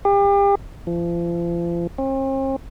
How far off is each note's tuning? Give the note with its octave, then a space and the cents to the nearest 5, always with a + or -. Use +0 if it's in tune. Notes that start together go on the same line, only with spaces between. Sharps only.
G4 +35
F3 -35
C4 +45